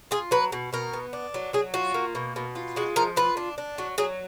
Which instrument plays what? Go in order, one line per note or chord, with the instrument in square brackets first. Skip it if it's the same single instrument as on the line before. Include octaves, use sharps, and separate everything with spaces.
[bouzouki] F4 G#4
F#3 B4
B2
B2 A#4
B3
D4
F#3
F#3 G#4
F4 F#4
A#3
B2
B2
F4
G#3 F#4
F3 A#4
F4 B4
D4
D4
F#3
F#3 G#4